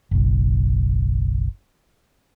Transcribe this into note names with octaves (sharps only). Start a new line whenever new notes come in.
F#1 B1